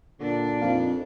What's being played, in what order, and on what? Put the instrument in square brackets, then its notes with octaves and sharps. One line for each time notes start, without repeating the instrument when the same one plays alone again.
[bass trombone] A#2 [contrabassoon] D3 [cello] D4
[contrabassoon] F2 [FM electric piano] D#4 F5